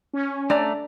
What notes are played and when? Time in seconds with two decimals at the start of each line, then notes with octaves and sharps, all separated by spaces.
0.13 C#4
0.50 A3 D4 D5 A#5